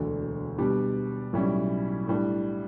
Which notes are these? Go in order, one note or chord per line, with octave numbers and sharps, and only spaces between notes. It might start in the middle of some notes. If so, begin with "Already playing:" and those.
Already playing: E1 D2 D3
B2 G3 D4 G4
B1 A2 G3 C#4 E4
A2 G3 D4